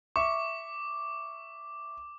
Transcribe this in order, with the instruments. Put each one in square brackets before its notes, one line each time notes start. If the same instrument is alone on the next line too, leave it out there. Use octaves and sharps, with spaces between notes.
[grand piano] E5 C#6 [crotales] D6